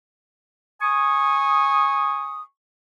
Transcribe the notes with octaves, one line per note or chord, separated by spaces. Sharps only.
G#5 C#6 D#6